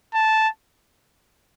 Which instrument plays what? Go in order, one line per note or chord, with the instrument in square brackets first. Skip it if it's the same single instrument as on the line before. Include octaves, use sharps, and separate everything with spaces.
[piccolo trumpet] A5